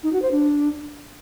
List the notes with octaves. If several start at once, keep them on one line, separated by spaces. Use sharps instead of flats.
D#4
F#4
C5
D4